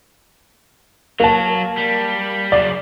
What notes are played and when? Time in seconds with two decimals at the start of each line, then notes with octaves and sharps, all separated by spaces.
1.20 F#3 A#3 F#4 A5
1.77 G3
2.52 F#2 C#3 D5